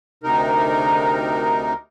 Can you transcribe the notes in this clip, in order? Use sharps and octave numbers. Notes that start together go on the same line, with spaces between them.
D2 C3 D#4 A#4